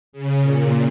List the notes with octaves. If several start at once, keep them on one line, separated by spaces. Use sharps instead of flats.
C#3
A#2